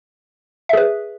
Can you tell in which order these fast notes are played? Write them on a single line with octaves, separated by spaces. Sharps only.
E5 G#4 B4